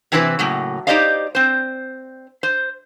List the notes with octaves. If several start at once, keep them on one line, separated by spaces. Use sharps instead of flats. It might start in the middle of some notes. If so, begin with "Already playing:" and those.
C3 E3 C4 E4 F4 B4
A2 C#3 F#3 A#3
D#4 G4 C5 D5 D#5 F5
C4 C5
C5